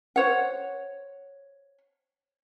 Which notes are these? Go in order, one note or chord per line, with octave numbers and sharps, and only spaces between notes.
C5 C#5 F#5